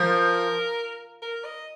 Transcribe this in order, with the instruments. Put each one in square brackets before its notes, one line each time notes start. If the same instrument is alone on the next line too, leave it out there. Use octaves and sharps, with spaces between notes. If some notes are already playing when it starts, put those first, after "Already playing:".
Already playing: [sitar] F3 [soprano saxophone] A#4
[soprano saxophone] A#4
D#5